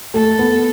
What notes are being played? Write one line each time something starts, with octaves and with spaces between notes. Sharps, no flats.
A3 A4
B3